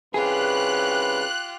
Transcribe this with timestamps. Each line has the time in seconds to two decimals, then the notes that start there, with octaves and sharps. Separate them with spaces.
0.14 C2 C#4 F4 G4 G#4 B4 F#6